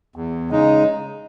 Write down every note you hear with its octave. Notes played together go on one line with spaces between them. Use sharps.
E2
C#3 G#3 D#4